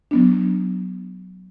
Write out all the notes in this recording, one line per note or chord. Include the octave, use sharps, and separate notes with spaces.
F#3 B3 D4